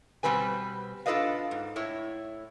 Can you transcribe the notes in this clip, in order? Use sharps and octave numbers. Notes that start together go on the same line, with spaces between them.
B2 G3 C4 B4 G#5
D4 F4 A4 B4 D#5 F5
G#2
A2 E4 C#5